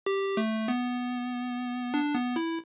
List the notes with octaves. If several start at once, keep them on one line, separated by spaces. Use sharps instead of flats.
G4
A3
B3
D4
B3
E4